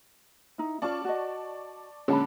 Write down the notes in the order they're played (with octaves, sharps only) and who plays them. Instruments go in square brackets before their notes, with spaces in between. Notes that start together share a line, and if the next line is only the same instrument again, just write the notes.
[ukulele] D#4 E4
[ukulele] C#4 F4 [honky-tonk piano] D5 A5 C#6
[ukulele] F#4 D#5
[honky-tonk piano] A#2 D3 G#3 [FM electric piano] C#4 [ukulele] D4 A5 B5